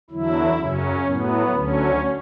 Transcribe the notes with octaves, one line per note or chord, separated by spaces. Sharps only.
E2 D3 F#3 E4
F#2 C#3 F#3 C#4
A2 F#3 B3
D2 D3 F#3 C#4